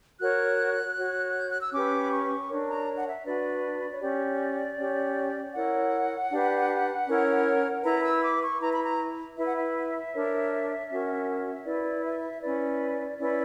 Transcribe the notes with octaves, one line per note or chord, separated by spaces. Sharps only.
F#4 A#4 C#5 F#6
F#4 C#5
G6
F#6
E6
C#4 G4 B4 D6
B5
C#6
D4 A#4 C#5
A#5
F#5
E5
D4 F#4 B4 D5
C#5
C#4 G4 C#5 D5
C#4 G4 C#5
E4 A#4 C#5 F#5
D4 G4 B4
C#4 E4 A#4 C#5
E4 B4 A#5
E6
D6
C#6
E4 B4 A#5
B5
A#5
E4 B4 E5
F#5
E5
D4 A#4 C#5
C#4 F#4 A#4
E4 B4 D5
E5
C#4 E4 B4 D5
C#4 E4 B4 D5